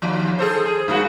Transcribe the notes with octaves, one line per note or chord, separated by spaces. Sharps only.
D#2 F3
G#4 A4 C5
G#4
G2 A#3 F#4